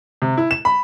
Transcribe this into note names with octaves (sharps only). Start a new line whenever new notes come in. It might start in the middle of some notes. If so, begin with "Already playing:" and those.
C3
E4
E7
B5